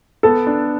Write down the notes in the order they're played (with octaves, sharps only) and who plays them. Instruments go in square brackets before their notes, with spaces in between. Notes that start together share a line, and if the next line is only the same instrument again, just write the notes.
[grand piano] B3 [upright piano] A4
[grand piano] D4